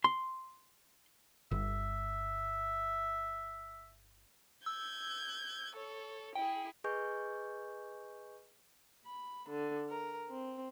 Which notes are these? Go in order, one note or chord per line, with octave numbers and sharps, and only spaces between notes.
C6
G1 E5
E6 G6 G#6
A4 C#5
E4 G#4 G5
G#4 B4 D#5 G#5 C#6 G6
B5
D3
A#4
C4